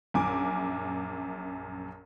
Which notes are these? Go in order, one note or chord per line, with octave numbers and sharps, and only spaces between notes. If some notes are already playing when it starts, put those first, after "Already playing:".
A#1 F#2 G#5 D6